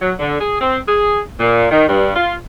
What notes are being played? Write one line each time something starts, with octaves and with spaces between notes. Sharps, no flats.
F#3
D3
G#4
C4
G#4
A#2
D#3
G2
F4